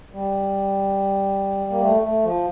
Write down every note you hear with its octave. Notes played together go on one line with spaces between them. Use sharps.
G3
A#3
A3
A3
F3